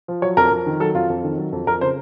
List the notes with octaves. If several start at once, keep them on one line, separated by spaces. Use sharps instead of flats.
F3
F#3 C#5
F2 A#4
F2
D#3
F#3 A4
F2 F4
F2
D#3
F#3
F2
F2 A#4
C#3 C5